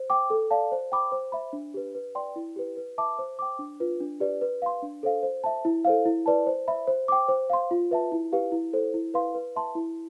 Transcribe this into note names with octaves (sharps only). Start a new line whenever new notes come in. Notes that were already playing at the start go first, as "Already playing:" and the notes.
Already playing: C5
G5 D6
A4
D5 F5 A5
C5
G5 B5 D6
C5
E5 B5
D4
G4 B4
B4
D5 G5 C6
E4
G4 B4
B4
E5 A5 D6
C5
G5 D6
D4
F4 B4
D4
G4 B4 D5
B4
F5 C6
D4
A4 C5 F5
C5
E5 A5
E4
A4 C5 F5
E4
B4 D5 A5
C5
E5 B5
C5
G5 D6
C5
F5 C6
F4
B4 E5 A5
E4
G4 B4 F5
E4
A4 C5
E4
B4 F5 C6
B4
E5 A5 C6
E4